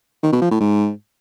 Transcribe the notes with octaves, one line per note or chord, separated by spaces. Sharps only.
D#3
B2
F3
A2
G#2